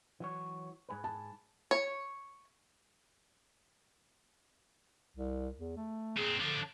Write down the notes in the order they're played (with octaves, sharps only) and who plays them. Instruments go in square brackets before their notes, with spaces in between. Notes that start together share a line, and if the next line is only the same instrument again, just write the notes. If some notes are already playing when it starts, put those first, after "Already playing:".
[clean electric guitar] E3 F#3 C#5
G#2 G#4 B4
[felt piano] A5
[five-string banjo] C#5
[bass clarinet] C2
E2
A3
[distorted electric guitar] A#2 C4 [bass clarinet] G#4
[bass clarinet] D3 [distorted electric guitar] F3 D4